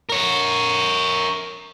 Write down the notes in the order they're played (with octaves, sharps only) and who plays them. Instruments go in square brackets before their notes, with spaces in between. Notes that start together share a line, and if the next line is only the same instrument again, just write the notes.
[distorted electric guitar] A#4 C#5